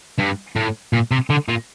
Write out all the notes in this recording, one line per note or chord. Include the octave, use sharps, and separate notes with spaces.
G2
A2
A#2
C3
D3
A#2